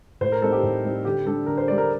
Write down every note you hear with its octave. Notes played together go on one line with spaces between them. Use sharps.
A2 C5
A#4
G3 C4 D#4 A4
G4
A2
G3 C4 D#4
D3 G4
G3 D4 A4
D3 A#4
C5
G3 D4 D5
A#4